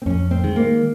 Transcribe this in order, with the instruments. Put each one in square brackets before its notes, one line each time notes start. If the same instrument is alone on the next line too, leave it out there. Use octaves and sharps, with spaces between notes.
[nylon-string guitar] C4
[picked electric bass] F2 [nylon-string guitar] C#4
[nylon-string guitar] C4
[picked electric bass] D#3 G#3
[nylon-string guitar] A#3